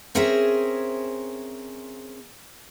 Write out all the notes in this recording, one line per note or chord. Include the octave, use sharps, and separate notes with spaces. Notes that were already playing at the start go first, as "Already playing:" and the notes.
C4 C#4 G#4 A#4 C5 E5